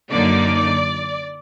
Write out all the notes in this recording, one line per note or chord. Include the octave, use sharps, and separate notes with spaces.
F#2 D3 F#3 A#3 D#4 D5